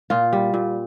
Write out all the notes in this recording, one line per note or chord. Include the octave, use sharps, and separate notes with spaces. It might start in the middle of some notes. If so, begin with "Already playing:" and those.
A#2 F4
G3
A#2